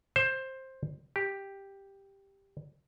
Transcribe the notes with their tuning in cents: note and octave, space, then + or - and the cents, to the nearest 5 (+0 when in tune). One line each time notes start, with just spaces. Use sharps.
C5 +15
G4 +5